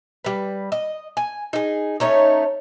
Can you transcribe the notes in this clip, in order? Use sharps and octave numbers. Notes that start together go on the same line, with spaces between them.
G3 B4
D#5
G#5
D#4 G#4
A3 C#4 D#4 C#5